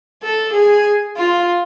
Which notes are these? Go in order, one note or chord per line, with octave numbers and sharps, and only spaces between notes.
A4
G#4
F4